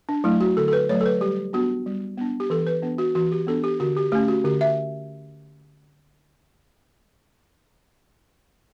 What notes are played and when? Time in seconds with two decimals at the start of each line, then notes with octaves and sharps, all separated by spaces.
0.09 D4
0.24 F#3 A3 E4
0.41 F#4
0.57 D3 A4
0.68 A4
0.73 B4
0.89 F#3 A3 C#5
1.01 A4
1.06 B4
1.21 G3 G4
1.53 B3 D4 F#4
1.86 G3
2.18 B3 D4
2.40 G4
2.50 E3 A4
2.67 B4
2.82 B3 D4
2.98 F#4
3.15 E3 F#4
3.32 G4
3.47 B3 D4 A4
3.64 G4
3.80 D3 F#4
3.97 G4
4.12 A3 C#4 G4
4.28 F#4
4.44 D3 G4
4.61 E5